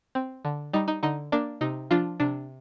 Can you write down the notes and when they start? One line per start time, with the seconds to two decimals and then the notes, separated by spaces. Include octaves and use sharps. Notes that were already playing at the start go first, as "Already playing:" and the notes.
0.15 C4
0.45 D3
0.73 G3 D#4
0.88 D#4
1.03 D3 D#4
1.32 A#3 D4
1.61 C3 D#4
1.91 F3 D4 F4
2.20 C3 D4